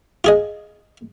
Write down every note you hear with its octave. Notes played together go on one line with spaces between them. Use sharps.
F4 G#4 D#5